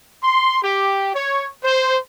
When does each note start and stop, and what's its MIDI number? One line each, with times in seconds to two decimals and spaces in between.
0.23 0.58 84
0.63 1.12 67
1.14 1.47 73
1.63 1.97 72